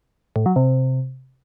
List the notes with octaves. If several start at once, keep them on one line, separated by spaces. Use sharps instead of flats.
A2
F#3
C3